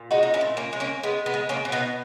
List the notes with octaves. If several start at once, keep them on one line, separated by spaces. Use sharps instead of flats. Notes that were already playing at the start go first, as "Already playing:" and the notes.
Already playing: A#2
G#3 D#4 F#4
D#4
C#4 E4
A#2
A#3 C#4
G#3
A#3 C#4
G#3 B3
B3
G#3
A#3 C#4
B2
B3 D#4